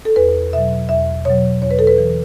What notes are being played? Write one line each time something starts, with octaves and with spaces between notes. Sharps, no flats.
A4
E2 B4
B2 F#3 E5
E2 E5
B2 F#3 C#5
E2 C#5
B4
A4
B4
E3